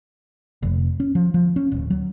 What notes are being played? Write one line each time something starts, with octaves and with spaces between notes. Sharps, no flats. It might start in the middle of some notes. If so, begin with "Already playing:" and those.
F1
C#4
F3
F3
C#4
D1
F#3